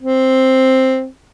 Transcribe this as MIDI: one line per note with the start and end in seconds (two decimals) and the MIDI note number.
0.02 1.07 60